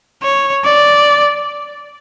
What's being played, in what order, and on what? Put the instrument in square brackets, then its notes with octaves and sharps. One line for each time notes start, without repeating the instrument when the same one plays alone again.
[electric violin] C#5
D5